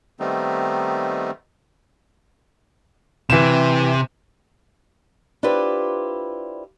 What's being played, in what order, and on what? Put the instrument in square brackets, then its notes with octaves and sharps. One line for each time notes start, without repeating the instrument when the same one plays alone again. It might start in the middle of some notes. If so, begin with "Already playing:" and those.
[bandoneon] D#3 G3 A3 B3 C4 D#4
[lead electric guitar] C3 [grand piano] E3 E7
[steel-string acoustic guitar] D4 E4 F4 G4 B4 C5